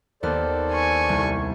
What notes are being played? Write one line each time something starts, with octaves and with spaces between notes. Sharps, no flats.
D#2 B3 A4 C5 D5 F6
G#5 C#6
C2